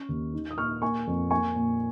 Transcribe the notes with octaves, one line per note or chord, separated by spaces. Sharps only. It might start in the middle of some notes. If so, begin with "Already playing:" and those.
Already playing: C#4 C#6 F6
D#2
D#4
D#6
A#2 C#6 F6
A#3 G#5 C#6
F2
A#3 G#5 C#6
A#2